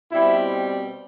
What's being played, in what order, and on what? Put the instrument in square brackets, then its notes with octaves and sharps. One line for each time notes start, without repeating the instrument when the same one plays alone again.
[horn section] B2 G3 C4 E4